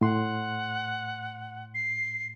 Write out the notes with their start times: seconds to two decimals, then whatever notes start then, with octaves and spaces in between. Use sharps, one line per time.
0.01 A2 F#5 C6
1.75 C7